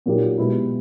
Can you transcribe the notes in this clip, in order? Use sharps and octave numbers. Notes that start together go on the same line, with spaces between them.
A#2 F#3 A#3 D#4 G4
B2 G#3 B3 E4 G4